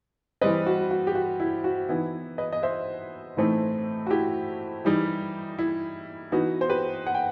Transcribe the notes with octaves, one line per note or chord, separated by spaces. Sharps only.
E3 G3 C4 B4 D#5
F#4
F#4
G4
F#4
E4
F#4
E3 B3 D#4 E4
B4 D#5
D#5
C5 E5
A2 E3 A3 C4 D#4
F#4
E4 G4
E3 G3 D#4
E4
E3 B3 D#4 F#4
C5
G4 B4
F#5
G5